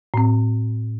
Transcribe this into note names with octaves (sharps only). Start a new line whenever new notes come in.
A2 C4